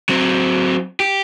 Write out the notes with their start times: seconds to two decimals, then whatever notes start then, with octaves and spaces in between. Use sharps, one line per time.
0.09 F#3 C4
1.00 G4